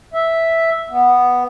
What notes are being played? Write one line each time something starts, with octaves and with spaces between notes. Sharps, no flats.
E5
B3